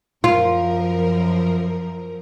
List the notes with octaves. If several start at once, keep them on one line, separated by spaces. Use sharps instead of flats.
F#2 F3 F4 A#4